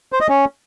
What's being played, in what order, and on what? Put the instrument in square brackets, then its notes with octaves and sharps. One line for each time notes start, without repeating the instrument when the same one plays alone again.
[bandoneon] C5
D#5
C#4